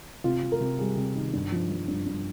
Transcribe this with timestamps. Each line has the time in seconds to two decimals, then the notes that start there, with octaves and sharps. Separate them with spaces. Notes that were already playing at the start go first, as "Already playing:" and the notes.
0.24 C3 F4
0.43 C3
0.52 A#4
0.61 C3
0.79 G3 G#4
0.97 C3
1.15 D#3
1.33 G2
1.52 F3
1.70 F3
1.88 G2
2.06 G2